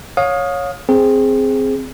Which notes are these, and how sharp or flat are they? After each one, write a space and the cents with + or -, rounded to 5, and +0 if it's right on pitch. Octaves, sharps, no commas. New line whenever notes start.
C#5 +0 F5 +30 D#6 -5
C4 +0 G#4 +0